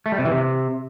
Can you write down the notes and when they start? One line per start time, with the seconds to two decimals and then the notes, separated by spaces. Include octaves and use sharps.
0.06 A3
0.12 G3
0.19 C3
0.25 E3
0.32 C3